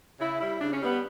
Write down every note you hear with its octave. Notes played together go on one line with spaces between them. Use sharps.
C#3 E4
G3 E4
C#3 D4
C#4
G3 B3